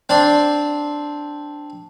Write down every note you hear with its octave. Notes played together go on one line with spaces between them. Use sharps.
C4 D4 D5